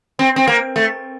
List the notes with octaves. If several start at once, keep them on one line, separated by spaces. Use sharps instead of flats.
C4
C4
A#3
A3